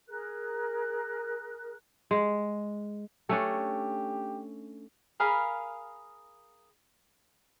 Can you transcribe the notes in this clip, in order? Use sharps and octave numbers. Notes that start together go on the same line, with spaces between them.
G#4 A#4 F#6
G#3
A3 C#4 D4 G4
G#4 A#4 F5 B5